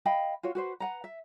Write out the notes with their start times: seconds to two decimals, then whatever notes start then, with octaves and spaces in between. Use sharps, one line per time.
0.05 D#5 F5 G5 B5
0.43 F4 F#4 C#5
0.55 F#4 B4 C5
0.80 B4 F#5 A#5
1.04 E5